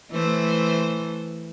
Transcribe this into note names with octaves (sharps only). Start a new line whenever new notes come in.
E3 A3 C5